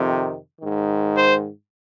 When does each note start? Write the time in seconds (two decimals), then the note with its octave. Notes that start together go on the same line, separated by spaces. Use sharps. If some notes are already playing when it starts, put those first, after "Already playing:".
Already playing: F2 C3 D#3
0.60 G#2 D#3
1.16 C5